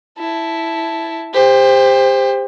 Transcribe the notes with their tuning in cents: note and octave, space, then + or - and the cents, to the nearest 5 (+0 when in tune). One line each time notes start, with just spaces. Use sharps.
E4 +0 A5 +0
G4 +30 C5 +0